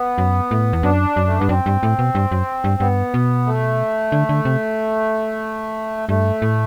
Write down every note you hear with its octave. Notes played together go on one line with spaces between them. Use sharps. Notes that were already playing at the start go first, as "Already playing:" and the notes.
Already playing: B3
F#2
A2
E2
F#2 D4
F#2
A3
G2 B3
F#2 C4
G2
A2
B2
G2
F#2
G2
G2 B3
B2
A3
D3
D3
C3
G2 A3
A2